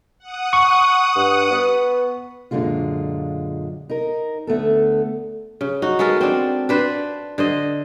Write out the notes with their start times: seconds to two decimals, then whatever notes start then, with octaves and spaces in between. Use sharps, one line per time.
0.19 F#5 D#6
0.53 C#6
1.15 G2
1.51 B3
2.51 F#2 A#2 D3 G#3 F4
3.89 D#4 A#4
4.47 D2 A3 B3 A4
5.61 C#3
5.82 D#4 F#4
5.99 G#3 B3 A4 A#4
6.21 C4 D4
6.69 D4 B4 C5
7.38 D3 C5 D#5